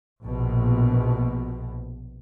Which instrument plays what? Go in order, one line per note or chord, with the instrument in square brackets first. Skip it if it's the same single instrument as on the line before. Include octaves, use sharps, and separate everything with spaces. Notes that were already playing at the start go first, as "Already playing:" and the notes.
[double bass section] A#1 B2